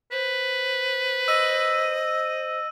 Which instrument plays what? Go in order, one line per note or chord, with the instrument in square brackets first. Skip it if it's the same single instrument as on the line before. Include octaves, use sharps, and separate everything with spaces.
[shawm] B4 [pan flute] C5
[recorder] D#5 [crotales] E6 D#7